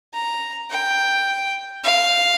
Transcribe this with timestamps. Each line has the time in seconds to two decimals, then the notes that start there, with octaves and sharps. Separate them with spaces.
0.14 A#5
0.70 G5
1.84 F5